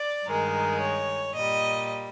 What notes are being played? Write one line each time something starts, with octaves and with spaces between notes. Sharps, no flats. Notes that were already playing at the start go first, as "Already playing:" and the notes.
Already playing: D5
G2 D#3 G#3 A#4
C#5
A#2 G3 D#5